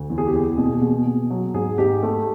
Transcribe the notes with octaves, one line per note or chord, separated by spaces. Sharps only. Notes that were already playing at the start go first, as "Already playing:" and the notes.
Already playing: D2
E2
G#4
G4
E2
B2
G#4
B2
B2
F#3
G#2 G#4
G#2 G4
A3